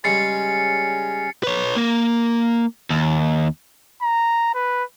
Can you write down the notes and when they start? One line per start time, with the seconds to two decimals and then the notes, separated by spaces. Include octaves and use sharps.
0.04 C#3 G3 G#3 C#4 A6 C7 C#7
1.43 B4 C#5
1.76 A#3
2.90 D#2
4.03 A#5
4.55 B4